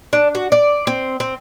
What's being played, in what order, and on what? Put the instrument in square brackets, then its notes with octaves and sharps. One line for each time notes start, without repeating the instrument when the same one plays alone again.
[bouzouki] D4
F#4
D5
C4
C4